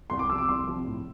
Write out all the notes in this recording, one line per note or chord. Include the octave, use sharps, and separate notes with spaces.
C2 C6
D6
C3 F3 E6
D6
C2 C6
C3 F3
A2